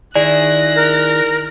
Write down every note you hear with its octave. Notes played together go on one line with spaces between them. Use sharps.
D#3 E4 G#4 D5 F#6 A#6
A#4